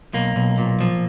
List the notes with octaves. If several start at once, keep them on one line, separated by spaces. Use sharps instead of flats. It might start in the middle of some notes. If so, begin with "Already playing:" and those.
B1 A#3
B1
A#2
F3